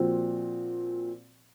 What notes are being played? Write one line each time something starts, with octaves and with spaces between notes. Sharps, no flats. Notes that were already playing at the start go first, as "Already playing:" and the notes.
Already playing: A#2 F3 C4 F#4